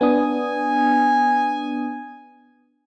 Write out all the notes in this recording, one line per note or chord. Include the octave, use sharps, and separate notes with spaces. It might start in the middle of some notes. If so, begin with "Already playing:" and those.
B3 D4 G#5 D#6